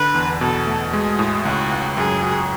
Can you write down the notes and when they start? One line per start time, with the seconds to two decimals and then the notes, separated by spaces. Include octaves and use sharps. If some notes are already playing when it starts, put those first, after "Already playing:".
Already playing: D3 B4
0.15 E2
0.41 B2 A4
0.67 A3
0.93 G#3 G#4
1.19 A2
1.45 C#2 F#4
1.71 C#2
1.97 F#2 G#4
2.23 F#4